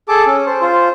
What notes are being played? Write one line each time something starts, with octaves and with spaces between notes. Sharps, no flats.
G#4 A4 A5 D6
C#4
C5
F4 C5